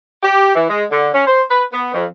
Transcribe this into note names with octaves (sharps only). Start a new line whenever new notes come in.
G4
E3
G#3
D3
C#4
C5
B4
B3
F2